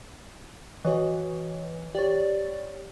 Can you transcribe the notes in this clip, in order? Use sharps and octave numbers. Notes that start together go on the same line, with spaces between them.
E3 F#4 C#5 D#5
G4 C#5 D5